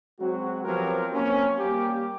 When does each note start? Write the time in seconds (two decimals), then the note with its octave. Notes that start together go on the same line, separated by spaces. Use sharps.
0.19 F#3 G#3 C4 F#4
0.65 F3 F#3 B3 C4 G4 A#4
1.13 A#3 C4 C#4
1.59 G3 A#3 G4